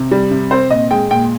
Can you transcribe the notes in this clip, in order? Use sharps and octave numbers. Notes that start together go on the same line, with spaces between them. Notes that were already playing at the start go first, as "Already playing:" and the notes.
Already playing: C3
G3
C3
C4 C5
A#2 D#5
G#3 G5
A#2 G5